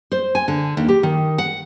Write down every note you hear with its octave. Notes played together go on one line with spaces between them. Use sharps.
C5
G#5
D3
D#2
G4
D#3
F#5